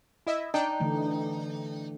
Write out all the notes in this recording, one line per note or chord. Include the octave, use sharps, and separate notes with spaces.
E4 D#5 E5
D4 D#4 G5
D3 E3 A3